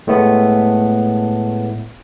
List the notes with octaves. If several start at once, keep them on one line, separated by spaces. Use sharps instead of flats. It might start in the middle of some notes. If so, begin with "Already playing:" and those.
A2 G#3 A3 B3